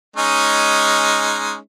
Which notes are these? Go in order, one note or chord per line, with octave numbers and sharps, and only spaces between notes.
G#3 C#4 D#4